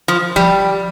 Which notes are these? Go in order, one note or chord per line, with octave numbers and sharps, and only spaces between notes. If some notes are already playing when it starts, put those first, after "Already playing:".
F3
F3 G3